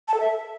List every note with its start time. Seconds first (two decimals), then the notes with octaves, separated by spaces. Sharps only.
0.08 A5
0.14 A4
0.20 E5